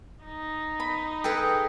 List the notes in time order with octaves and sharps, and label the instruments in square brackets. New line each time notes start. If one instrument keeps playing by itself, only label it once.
[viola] D#4
[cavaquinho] B5
[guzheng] G#4 A4 B4 [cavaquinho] G5